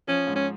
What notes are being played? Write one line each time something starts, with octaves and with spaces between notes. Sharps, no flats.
F3 C#4
G#2
C#4